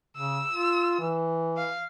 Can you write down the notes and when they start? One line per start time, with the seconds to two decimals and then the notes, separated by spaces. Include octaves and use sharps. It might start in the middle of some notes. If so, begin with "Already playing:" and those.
0.17 C#3 E6
0.52 F4
1.00 E3
1.57 F5